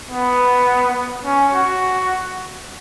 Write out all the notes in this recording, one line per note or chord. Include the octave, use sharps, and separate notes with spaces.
B3
C#4
F#4